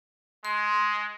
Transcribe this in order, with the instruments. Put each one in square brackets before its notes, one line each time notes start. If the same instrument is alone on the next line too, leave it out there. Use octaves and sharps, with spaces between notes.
[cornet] G#3 [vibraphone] C6